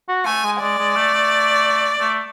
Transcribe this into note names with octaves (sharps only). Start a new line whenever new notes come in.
F#4
A3 G#5
G#3
G#3 D5
G#3
A3
A3
A3